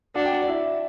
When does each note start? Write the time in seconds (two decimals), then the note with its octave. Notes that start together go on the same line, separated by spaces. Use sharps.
0.15 D4 F#4 F#5
0.25 G5
0.32 F#4 F#5
0.42 D5
0.48 E4 E5